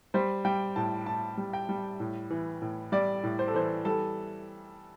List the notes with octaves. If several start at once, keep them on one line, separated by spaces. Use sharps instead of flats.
G3 C5
G3 G5
A2 A5
A2 A5
G3
G5
G3
A2
E3
A2
G3 D5
A2
C5
A4
E3 C5
G3 A4